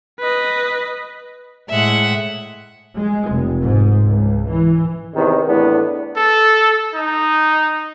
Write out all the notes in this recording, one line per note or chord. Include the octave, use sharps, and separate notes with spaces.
B4 D#5
A2 G#3 E5 F#5
G#3
F1
G#2
C#2
E3
E2 C3 D#3
E2 A2 B3 D4
A4
D#4